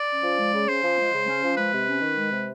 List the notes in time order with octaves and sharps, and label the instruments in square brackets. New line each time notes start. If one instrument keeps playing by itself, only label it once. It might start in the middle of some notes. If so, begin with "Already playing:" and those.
Already playing: [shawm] D5
[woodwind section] C#4
F3
G#3
C#3
[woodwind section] C#4 [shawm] C5
[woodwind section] F3
G#3
C#3
C#4
F3
[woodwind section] G#3 [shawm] B4
[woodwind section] C3
C#4
D#3
G#3
C3